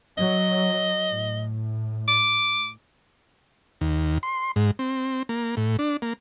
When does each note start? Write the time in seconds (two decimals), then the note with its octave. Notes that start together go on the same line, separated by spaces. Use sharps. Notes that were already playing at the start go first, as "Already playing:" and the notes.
0.18 F#3 D#5
1.10 A2
2.08 D6
3.81 D#2
4.23 C6
4.56 G#2
4.79 C4
5.29 A#3
5.57 A2
5.79 D4
6.02 A#3